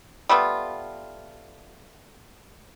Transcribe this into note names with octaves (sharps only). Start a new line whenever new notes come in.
G3 A3 B3 F4